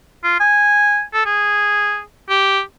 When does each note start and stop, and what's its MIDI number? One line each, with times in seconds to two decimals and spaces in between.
0.24 0.40 65
0.40 1.01 80
1.13 1.23 69
1.26 2.00 68
2.29 2.61 67